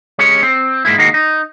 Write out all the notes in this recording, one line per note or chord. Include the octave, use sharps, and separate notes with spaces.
G#3 C#4 G4 C#5
C4
G#2 G#3 A#3 E4
D#3 G#3 A#3 F#4
D#4